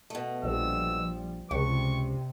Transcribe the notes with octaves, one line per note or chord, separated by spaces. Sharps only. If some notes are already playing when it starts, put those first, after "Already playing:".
B2 A3
A#1 F3 G3 E6
C#2 G2 C3 C#6